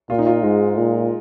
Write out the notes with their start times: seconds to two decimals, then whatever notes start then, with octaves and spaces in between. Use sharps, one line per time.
0.10 A#2 F4
0.18 D#4
0.27 F4
0.43 G#2 G#3
0.77 A#2